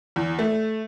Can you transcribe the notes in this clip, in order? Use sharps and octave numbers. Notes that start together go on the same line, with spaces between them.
E2
A3